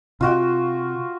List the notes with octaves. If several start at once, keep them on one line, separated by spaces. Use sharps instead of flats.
C3 F4 F#4 G5